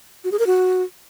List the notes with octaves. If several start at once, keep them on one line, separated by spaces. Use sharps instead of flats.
F#4
G#4
A#4
F#4